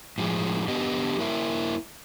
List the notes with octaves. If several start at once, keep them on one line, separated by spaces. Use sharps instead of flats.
A2 F3 G#3
D3 B3 G4 D#5
A#3 E4 A#4 E5